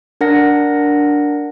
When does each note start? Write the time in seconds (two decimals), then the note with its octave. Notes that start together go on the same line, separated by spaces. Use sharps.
0.21 D4 A#4 F#5 A#6